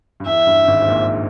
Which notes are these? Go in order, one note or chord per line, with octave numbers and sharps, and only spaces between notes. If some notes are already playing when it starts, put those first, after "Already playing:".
G2
E2 E5
G2
G#1 G#2
G#2
A#1 A#2